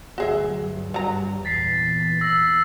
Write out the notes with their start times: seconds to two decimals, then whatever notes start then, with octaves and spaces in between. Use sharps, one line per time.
0.18 G1 D2 F#3 F#4 G#4 E5
0.61 G2
0.94 F#3 A#5
1.45 E2 A#2 A6 B6 C7
2.21 E6 A#6